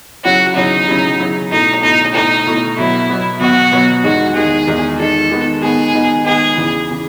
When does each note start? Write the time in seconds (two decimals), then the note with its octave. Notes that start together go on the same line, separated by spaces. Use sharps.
0.25 C#3 F#3 C#4 E4 F#4
0.56 C#3 F#3 C#4 D#4 E4
0.87 C#3 F#3 C#4 E4
1.20 C#3 F#3 C#4 E4
1.51 B2 A3 D#4 E4
1.83 B2 A3 D#4 E4
2.14 B2 A3 D#4 E4
2.46 B2 A3 E4
2.78 B2 F#3 B3 E4
3.09 B2 F#3 B3
3.41 B2 F#3 B3 F#4
3.72 B2 F#3 B3
4.04 E2 D#3 G#3 D#4 F#4
4.35 E2 D#3 G#3 D#4 G#4
4.67 E2 D#3 G#3 D#4
4.99 E2 D#3 G#3 D#4 A4
5.31 D#3 G#3 B3 D#4
5.63 D#3 G#3 B3 D#4 G#4
5.94 D#3 G#3 B3 D#4
6.25 D#3 G#3 B3 D#4 G#4
6.57 E2 C#3 E3
6.90 C#3 E3